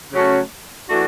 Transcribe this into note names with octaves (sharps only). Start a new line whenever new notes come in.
C#3 F#3 A3 C#4 F#4
E3 A3 D4 F#4